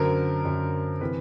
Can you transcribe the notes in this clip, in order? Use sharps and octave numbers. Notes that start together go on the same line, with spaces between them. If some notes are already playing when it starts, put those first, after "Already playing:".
Already playing: F#2 D3 F#3 A#4 C5
F#2 D3 F#3
C3 E3 B4